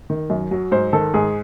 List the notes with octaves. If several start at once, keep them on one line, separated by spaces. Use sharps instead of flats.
D#3
F#2
F#3
G#2 C5
D#3 A4
G#2 G#4